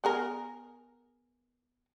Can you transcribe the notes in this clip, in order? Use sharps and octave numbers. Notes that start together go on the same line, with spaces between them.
B3 G#4 A#4